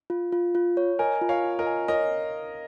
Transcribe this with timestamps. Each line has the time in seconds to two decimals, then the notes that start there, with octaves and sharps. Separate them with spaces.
0.10 F4
0.32 F4
0.55 F4
0.77 C#5
0.99 A#4 D#5 G#5
1.21 F4
1.29 C#5 F5
1.44 F4
1.59 A#4 D#5
1.67 G#5
1.88 A#4 C#5 D#5